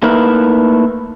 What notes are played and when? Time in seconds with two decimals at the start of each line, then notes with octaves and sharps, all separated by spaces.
0.03 A3 A#3 D#4 E4 A#4 B4